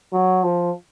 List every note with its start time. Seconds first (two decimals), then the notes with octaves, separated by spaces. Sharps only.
0.13 F#3
0.44 F3